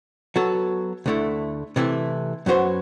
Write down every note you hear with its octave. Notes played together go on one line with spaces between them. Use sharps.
F#3 B3 F#4 A4
D2 D3 A3 E4
C3 E3 A3 E4
F#2 F#3 B3 F#4 C5